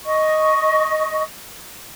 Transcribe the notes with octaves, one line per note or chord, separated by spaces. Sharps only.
D#5 C#6